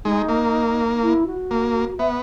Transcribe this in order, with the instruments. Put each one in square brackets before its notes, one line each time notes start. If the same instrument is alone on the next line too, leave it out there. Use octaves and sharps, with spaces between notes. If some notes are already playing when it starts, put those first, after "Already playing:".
[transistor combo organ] G#3 [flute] D#4
[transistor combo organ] A#3
[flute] E4
F#4
[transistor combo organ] A#3
[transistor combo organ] B3 [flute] E5